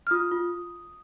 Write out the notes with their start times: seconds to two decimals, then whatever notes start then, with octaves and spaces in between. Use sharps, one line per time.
0.07 F6
0.11 F4 D#6
0.32 F4